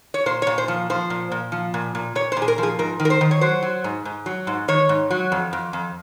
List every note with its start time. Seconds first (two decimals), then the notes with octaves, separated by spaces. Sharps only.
0.14 C#5
0.26 A#2 C5
0.42 C#5
0.47 A#2
0.58 C5
0.68 F3
0.90 F3 C5
1.10 A#2
1.32 A#2
1.52 F3
1.74 A#2
1.95 A#2
2.15 A#2 C#5
2.32 C5
2.37 A#2
2.42 G#4
2.48 A#4
2.58 F3
2.63 G#4
2.79 G#2 A#4
3.00 D#3
3.05 A#4
3.10 C5
3.21 D#3
3.31 C#5
3.41 F#3 C5
3.63 F#3
3.84 G#2
4.05 G#2
4.26 F#3
4.47 G#2
4.68 D#3 C#5
4.89 G#2
5.10 F#3
5.32 F2
5.53 F2
5.73 F2